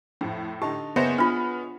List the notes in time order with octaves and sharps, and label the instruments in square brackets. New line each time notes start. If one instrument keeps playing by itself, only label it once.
[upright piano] F2 [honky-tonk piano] A2
[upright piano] D3 D#4 A5 [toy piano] G4
[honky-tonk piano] F#1 C5 C#7 [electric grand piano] B3 [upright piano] G#4 C#5 D#5 [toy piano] E5
[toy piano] D4 F4 [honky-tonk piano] B5 F6